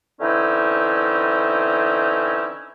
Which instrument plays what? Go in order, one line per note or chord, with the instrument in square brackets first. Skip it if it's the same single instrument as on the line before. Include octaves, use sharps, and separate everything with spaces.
[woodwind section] D3 E3 C4 C#4 D#4 E4